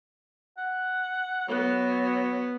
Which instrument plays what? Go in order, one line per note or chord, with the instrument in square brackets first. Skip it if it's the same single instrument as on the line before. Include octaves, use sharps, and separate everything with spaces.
[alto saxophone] F#5
[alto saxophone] F#3 [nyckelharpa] B3